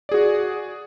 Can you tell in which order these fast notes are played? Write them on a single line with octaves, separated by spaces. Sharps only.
D5 G#4 F#4